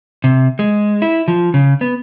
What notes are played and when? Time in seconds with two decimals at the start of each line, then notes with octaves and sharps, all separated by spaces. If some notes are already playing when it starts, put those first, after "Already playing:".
0.24 C3
0.59 G#3
1.02 E4
1.28 F3
1.54 C#3
1.81 B3